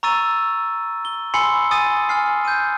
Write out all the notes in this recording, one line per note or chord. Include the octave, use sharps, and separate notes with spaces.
A#5 C#6 E6 A6 D#7
G7
G#5 B5 C6 E6 C7 C#7
G#5 D#6 A6 D#7
G#5 F6 C7
G6 D#7